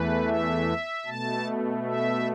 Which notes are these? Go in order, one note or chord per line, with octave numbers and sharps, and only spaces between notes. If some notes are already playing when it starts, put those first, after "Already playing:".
Already playing: E2 E3 A3 B4
E5
B2 A3 A5
E5